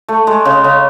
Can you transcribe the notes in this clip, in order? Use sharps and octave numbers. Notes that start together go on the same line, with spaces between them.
A3
G#3
C#3
C#3